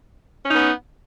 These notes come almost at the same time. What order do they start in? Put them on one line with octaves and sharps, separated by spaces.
C#4 D#4 B3